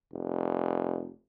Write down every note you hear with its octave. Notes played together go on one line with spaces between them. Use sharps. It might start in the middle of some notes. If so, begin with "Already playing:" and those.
F1